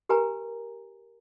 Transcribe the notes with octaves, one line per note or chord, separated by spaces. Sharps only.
G4 A#4 B4 G#5 A#5